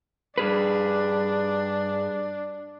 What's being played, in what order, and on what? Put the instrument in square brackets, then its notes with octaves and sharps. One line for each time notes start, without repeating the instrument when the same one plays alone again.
[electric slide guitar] G2 G#4 B4 [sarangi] D4